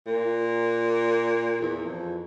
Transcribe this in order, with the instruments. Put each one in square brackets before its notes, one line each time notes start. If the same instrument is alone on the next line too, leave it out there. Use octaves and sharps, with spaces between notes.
[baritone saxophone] A#2
E2
F2